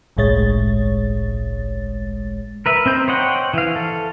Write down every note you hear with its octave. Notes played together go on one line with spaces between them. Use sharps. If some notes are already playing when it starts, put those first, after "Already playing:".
G1 C2 A2 G#3 C#5 A6
A#4 B4 E5
C4 D#4 G6
C5 C#5 D#5 F#5 G5
E3 F5
A4